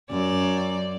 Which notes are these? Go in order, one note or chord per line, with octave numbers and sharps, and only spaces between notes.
F#2 D5